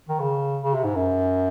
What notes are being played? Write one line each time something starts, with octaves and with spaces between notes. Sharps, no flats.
D#3
C#3
C#3
C3
G#2
F#2